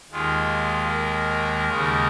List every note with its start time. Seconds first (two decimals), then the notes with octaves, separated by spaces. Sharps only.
0.12 D#2 D#3 G#3 F4
0.90 A#4
1.68 D#2 C#3 G#3